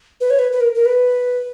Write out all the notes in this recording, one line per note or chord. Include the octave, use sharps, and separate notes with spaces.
B4
C#5
B4
B4
A#4
A#4
B4